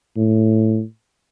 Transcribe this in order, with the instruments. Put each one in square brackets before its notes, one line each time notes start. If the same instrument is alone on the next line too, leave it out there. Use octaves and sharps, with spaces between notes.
[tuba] A2